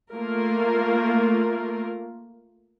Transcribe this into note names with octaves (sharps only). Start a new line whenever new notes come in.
A3 A#3 F4 A#4